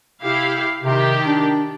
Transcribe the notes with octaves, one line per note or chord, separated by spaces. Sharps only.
C3 E4 G4 F5
C3 D#3 G4
D4